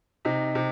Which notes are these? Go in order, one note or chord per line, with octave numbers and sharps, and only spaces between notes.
C3 D#4
C3